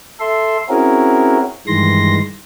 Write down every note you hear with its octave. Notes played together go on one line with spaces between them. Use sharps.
A4 E5 C6
C4 C#4 E4 F#4 G#4 A#4
G2 D#3 E3 G#3 C6 A#6